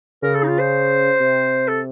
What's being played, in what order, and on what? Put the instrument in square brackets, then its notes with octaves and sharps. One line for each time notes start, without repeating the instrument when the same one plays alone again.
[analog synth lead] C#3 [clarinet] A#4
[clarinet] A4
D#4
F4
C5
[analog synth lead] C3
[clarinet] A4